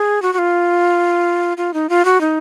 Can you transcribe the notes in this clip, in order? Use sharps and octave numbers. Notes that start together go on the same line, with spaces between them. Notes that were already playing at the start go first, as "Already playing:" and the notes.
Already playing: G#4
F#4
F#4
F4
F4
D#4
F4
F#4
D#4